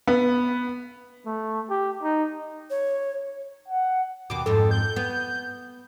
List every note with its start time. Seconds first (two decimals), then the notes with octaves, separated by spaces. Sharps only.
0.07 B3
1.26 A3
1.70 G4
2.03 D#4
2.70 C#5
3.69 F#5
4.30 D#2 B2 D6
4.46 F2 G#2 A4
4.71 G6
4.96 B3